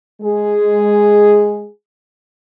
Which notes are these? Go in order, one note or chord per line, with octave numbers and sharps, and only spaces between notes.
G#3 G#4